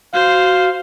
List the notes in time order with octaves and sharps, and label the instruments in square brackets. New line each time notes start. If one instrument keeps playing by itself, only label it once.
[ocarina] F#4 [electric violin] C5 [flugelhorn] F5